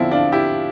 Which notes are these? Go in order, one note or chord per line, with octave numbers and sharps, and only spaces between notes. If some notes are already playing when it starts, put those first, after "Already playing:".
Already playing: E2 D3 F3 C4 E4
D4 F4
E4 G4